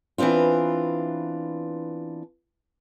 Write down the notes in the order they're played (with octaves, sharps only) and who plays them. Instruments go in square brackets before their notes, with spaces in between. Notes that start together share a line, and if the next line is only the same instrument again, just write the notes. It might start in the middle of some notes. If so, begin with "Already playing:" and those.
[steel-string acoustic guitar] E3 B3 C4 D4 F4